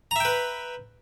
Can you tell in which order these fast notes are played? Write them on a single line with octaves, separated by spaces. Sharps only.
A#5 E5 G5 B4